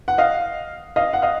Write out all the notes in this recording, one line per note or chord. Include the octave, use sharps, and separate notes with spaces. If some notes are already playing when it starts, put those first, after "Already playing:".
F#5
D#5 F5
D#5 F5
F#5
D#5 F5